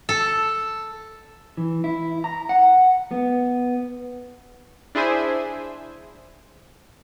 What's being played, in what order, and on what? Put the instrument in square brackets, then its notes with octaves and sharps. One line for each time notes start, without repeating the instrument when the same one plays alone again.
[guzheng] A4
[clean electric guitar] E3
E4
A#5
F#5
B3
[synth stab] D4 E4 G#4 C5 E5 G#5